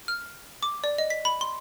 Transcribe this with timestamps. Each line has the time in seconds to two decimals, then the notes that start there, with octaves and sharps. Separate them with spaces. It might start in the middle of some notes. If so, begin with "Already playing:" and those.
0.08 F6
0.63 D6
0.84 D5
0.98 D#5
1.10 B6
1.25 B5
1.41 C6